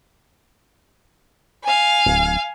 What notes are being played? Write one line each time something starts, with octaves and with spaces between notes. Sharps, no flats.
F5 G#5
D1